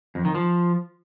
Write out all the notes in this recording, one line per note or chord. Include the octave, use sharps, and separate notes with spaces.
F2
D#3
F3